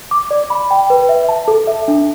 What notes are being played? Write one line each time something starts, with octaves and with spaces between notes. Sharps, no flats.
D6
D5
B5
G5
B4
E5
A5
A4
E5
D4